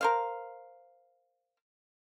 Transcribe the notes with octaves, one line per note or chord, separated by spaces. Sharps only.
A#4 C5 F5